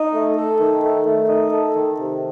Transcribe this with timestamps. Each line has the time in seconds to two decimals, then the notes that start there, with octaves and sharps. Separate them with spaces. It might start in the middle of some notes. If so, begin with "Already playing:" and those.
Already playing: D#4
0.13 A3
0.35 A4
0.59 D#3
0.83 A3
1.05 A3
1.28 D#4
1.52 A4
1.75 D#3
1.99 C3